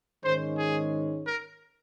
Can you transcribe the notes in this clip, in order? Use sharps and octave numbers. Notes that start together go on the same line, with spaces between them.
G#2 D#3 G#3 C#4 C5
G#4
A#4